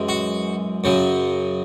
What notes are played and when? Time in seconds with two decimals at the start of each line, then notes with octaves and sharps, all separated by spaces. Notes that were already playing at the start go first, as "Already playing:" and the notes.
Already playing: F#2 E3 G#3
0.09 F#4
0.84 F#2 C#3 F#3